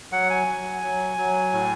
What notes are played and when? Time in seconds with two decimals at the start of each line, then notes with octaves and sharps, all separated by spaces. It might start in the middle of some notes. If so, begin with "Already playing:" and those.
0.12 F#3 F#5
0.30 G#5
0.47 F#3
0.83 F#3
1.18 F#3
1.53 A2